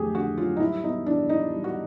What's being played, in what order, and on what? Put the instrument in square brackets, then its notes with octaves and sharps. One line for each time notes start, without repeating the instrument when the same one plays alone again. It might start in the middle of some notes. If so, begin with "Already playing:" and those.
Already playing: [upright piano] F2 D3 F#3 A3 [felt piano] G4 G#4
[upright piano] D3 [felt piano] F#4
[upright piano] F#3 [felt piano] F4
[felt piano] D#4
[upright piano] G3 [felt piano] E4
[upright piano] B3 [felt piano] D#4
[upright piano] E3 [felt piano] D4
[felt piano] D#4 [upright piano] E4
[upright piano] G3
[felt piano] F#4